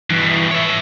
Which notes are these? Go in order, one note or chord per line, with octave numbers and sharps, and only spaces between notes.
G2 B2 E3
C#5 E5